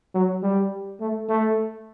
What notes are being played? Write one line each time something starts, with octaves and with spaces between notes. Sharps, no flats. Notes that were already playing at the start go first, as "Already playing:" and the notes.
F#3
G3
A3
A3